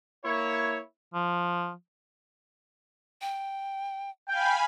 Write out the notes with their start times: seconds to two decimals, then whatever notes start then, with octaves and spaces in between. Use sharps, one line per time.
0.24 A#3 E4 C#5
1.14 F3
3.22 G5
4.29 F5 G5 G#5 B5